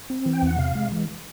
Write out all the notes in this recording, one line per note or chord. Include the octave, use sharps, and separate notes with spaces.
C4
E3
G5
E2 F#5
C3 F5
G#3
E3